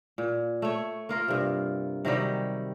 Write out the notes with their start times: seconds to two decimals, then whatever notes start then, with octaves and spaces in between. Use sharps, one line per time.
0.18 A#2
0.62 A3 C#5
1.09 A#3 F4 A#4
1.28 G2 C3
2.05 C3 D#3 F#3 G3